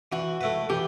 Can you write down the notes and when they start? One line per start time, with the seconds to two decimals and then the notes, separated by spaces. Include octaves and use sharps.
0.12 E3 F#4
0.41 A3 E4 B4
0.69 E3 G4